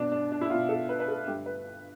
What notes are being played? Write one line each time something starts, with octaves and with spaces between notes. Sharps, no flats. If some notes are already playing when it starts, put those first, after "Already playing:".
Already playing: B2 B3 D4
D4
D4
E4
B2 B3 F4
A4
B4
B4
A4
G2 D3 A3 G4
B4